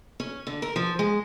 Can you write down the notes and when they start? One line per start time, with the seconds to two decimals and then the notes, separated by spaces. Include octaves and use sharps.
0.20 C#4
0.47 D3
0.62 A#4
0.76 F3
0.99 G#3